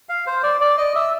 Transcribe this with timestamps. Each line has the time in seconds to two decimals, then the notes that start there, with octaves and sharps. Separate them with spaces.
0.09 F5
0.27 C5
0.43 D5
0.61 D5
0.77 D#5
0.95 E5